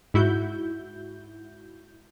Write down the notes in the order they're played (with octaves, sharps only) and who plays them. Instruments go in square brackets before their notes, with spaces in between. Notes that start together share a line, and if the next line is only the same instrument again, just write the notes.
[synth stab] G#2 E4 F#4 G6